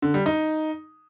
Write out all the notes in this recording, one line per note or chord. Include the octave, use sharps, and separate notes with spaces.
D3
G3
D#4